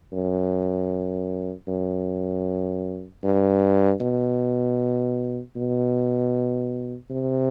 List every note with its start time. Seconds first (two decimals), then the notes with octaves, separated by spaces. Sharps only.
0.13 F#2
1.67 F#2
3.23 G2
4.01 B2
5.56 B2
7.10 C3